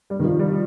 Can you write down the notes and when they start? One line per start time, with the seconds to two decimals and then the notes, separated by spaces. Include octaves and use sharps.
0.10 G3
0.19 D#3
0.24 F3
0.39 G3